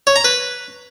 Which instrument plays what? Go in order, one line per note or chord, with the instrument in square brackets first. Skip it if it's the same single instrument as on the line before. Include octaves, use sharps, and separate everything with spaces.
[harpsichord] C#5
A#5
B4